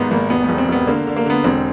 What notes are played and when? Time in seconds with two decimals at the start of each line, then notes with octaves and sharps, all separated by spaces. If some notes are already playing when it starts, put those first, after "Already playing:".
Already playing: G#1 G#2 A#3 B3
0.11 G#1 A#3
0.30 E1 B3
0.44 E1 B3
0.58 C4
0.68 E1 B3
0.87 D3 A#3
1.07 D3
1.16 A#3
1.26 D3 B3
1.44 E1 C4